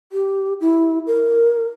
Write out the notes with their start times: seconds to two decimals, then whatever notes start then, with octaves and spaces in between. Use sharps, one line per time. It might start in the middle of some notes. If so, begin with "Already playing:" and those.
0.12 G4
0.61 E4
1.07 A#4